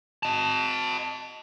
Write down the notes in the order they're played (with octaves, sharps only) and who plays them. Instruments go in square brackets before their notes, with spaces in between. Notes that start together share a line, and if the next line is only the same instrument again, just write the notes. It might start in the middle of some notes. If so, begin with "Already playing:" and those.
[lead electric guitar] D#5 A5